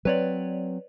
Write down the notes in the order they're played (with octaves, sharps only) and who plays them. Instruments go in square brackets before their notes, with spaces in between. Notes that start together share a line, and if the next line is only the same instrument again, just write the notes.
[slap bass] F#3 C4 [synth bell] B4 C#5 D5